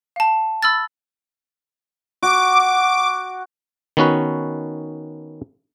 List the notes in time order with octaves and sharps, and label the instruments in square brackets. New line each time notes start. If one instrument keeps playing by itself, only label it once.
[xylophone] F5 A5
B5 E6 F6 A6
[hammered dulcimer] F#4 [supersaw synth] D6
[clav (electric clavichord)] D#3 B3 C#4 F#4 B4